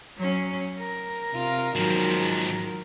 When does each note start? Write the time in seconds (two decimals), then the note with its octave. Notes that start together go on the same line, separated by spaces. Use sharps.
0.17 F#3 C#4
0.80 A#4
1.32 C3 F4
1.76 G#2 D#3 F3 F#3